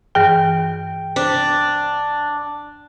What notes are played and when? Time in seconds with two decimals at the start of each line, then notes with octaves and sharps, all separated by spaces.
0.15 G2 E3 G#4 G5
1.16 D4 C5